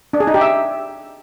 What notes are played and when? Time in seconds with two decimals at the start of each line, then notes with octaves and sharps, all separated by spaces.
0.13 D4
0.20 G#4
0.27 D#4
0.34 G4
0.41 E5